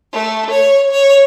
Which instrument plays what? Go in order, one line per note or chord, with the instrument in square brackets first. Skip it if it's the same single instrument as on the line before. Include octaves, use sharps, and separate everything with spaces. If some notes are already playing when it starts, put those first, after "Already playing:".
[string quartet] A3
C#5
C#5